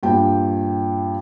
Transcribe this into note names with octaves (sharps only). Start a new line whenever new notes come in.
G2 A#2 G5